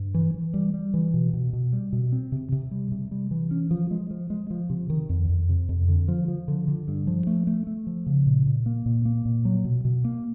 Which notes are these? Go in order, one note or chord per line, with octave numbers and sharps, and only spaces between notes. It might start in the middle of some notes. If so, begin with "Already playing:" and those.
Already playing: G2
E3
E3
G3
G3
E3
B2
B2
B2
G3
B2
C4
C3
C3
G3
C3
G3
E3
C#4
F3
G#3
F3
G#3
F3
C3
D#3
F2
F2
C3
F2
D3
F3
F3
D3
D3
G2
F3
A3
A3
A3
F3
C#3
A#2
A#2
A#3
A#2
A#3
A#2
F#3
B2
B2
A#3